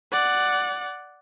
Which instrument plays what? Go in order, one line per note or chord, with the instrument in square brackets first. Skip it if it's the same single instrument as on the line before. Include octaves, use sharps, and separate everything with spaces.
[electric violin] D5 F#5